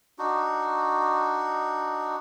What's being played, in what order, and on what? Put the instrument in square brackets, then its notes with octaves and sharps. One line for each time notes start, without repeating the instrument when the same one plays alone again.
[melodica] D4 D#4 F#4